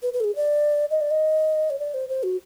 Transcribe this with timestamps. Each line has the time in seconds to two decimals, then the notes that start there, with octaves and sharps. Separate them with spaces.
0.02 B4
0.13 B4
0.20 A4
0.24 G#4
0.36 D5
0.91 D#5
1.01 D5
1.11 D#5
1.70 C#5
1.79 D5
1.94 C5
2.09 C5
2.23 F#4